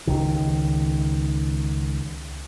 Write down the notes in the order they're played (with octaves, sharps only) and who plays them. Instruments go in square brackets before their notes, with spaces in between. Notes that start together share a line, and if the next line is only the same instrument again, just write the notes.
[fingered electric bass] C#2 D#3